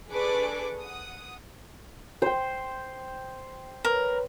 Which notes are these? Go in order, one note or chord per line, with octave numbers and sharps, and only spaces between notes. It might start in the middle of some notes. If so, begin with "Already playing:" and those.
D4 G#4 A4 B4 C#6 D6
F#5 D#6
C5 G5
A#4 B4 C#5